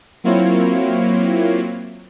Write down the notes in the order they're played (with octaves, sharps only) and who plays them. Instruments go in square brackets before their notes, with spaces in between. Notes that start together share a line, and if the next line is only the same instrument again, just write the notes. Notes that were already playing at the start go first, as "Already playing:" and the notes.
[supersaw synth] F#3 A#3 C4 E4 F4 C#5